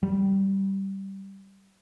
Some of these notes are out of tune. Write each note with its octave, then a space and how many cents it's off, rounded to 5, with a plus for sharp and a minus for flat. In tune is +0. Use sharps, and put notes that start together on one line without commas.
G3 -10